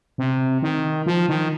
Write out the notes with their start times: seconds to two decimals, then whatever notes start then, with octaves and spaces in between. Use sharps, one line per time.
0.18 C3
0.62 D#3
1.06 F3
1.29 D#3